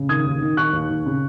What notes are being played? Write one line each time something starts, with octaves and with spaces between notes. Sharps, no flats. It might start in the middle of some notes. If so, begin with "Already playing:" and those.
Already playing: C#3
D#3 D#6 G#6
D#2
D#3
D#3 C#6 F#6
D#2
D#2
C#3